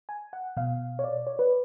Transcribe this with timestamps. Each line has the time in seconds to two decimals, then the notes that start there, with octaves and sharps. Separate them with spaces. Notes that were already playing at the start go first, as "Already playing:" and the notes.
0.09 G#5
0.33 F#5
0.57 B2 F5
0.99 C#5
1.04 D5
1.27 C#5
1.39 B4